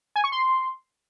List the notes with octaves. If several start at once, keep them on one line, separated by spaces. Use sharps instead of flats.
G#5
C#6
C6